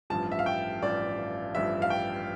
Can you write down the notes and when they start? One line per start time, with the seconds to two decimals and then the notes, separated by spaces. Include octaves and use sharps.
0.10 A1 G2 F3 A5
0.32 E5
0.39 F5
0.46 G5
0.82 A1 G2 F3 D5
1.55 A1 G2 F3 E5
1.82 F5
1.90 G5